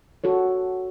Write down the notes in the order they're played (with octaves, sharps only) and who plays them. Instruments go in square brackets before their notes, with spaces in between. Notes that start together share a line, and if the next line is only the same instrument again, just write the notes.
[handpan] F#4 A4 C#5